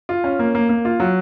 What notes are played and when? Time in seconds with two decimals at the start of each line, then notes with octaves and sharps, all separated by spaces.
0.09 F4
0.24 C#4
0.39 A#3
0.55 A#3
0.69 A#3
0.85 F4
1.00 F#3